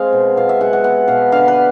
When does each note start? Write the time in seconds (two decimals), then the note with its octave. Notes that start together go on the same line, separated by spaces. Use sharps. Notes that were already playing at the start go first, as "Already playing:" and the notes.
Already playing: G#3 C4 F5
0.13 B2
0.37 B2 F5
0.49 E5
0.61 G#3 F#5
0.73 F#5
0.84 B3 F#5
1.08 B2 F5
1.32 D3 F5
1.48 B4